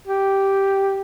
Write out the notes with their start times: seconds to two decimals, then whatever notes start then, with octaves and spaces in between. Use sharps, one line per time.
0.07 G4